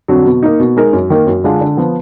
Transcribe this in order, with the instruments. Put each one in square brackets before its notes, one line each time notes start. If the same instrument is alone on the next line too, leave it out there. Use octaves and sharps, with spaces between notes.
[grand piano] F2 D3 F#3
B2
A#3 D#4
B2
G#3 D#4 A#4
F#2
D#3 A#3
F#2
D3 G#3 D4 F4
D3
F3 B3